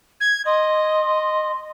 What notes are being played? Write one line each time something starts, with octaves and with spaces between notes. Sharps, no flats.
G#6
D#5 C6